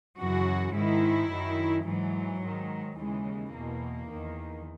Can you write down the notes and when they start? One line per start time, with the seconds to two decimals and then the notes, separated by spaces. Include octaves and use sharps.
0.19 F#2 C#3 E3 F#4
0.74 G#2 D#3 E4
1.30 F#2 D#3
1.86 G#2 E3 F#3
2.41 G#2 D#3
2.97 D#2 C#3 E3 G#3
3.52 E2 B2 A#3
4.09 E2 D#3